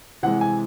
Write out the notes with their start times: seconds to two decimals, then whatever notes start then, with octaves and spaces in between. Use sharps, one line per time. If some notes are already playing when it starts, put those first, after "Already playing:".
0.23 C3 E3 G#3 F#5
0.41 G#5